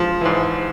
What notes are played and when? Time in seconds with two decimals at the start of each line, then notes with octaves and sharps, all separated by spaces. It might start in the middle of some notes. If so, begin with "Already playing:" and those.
Already playing: F3
0.21 G#2 E3